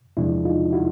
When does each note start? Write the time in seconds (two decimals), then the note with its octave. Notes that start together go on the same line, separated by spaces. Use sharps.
0.17 E2 C3 F3 G#3 D4 E4
0.45 D#4 F4
0.73 E4 F#4